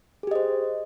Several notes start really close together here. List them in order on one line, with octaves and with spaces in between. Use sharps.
G#4 G4 D#5 C5